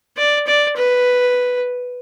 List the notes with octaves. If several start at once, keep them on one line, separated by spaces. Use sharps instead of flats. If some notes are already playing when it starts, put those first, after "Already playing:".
D5
D5
B4